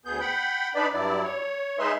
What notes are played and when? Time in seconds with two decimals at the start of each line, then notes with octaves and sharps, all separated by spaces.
0.05 D2 B3 G#4 G6
0.20 F#5 G5 B5
0.75 D4 D#4 B4 D5 B5
0.93 G2 F#3 E4 D5
1.23 C#5
1.79 G#3 D#4 G#4 B4 E5 C6